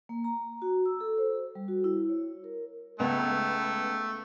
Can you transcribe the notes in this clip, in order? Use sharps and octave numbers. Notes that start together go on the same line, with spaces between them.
A#3
A#5
F#4
E6
A4
C5
G3
F#4
E4
C#5
A#4
C#2 A3 B3